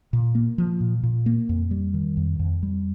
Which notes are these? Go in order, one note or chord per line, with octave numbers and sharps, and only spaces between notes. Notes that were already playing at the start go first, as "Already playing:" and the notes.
A#2
A#3
F3
A#2
A#2
A#3
F2
G3
D#3
F2
F2
G3